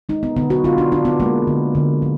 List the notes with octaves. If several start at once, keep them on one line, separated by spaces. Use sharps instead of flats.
G#3 D#4
B3
D3 B3
F#4
D3 F4
D4
F3 D4
B3
G#3 A#3
D3
D3
F3